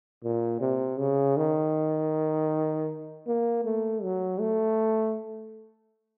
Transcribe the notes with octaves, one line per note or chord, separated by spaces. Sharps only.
A#2
C3
C#3
D#3
A#3
A3
F#3
A3